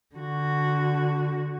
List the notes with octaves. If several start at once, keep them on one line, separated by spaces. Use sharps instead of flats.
D3 F#4